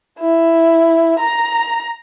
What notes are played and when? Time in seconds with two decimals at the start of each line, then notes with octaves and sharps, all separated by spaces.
0.19 E4
1.19 A#5